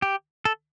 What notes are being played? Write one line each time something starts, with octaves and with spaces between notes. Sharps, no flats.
G4
A4